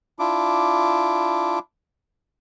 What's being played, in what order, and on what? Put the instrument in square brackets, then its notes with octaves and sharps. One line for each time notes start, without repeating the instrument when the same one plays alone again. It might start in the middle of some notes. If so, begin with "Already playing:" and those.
[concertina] D4 E4 F4 D6